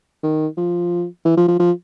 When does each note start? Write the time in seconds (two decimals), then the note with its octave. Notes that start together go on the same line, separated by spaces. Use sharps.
0.23 D#3
0.57 F3
1.25 E3
1.37 F3
1.48 F3
1.59 F3